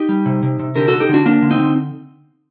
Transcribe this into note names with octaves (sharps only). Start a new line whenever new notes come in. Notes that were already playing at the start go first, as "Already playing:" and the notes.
Already playing: D#4 G4
G3
C3
C3
C3
D3 G4 A#4
D3 F#4 A4
D#4 G4
D3 D4 F#4
A#3 D4
D3
C4 D#4
D3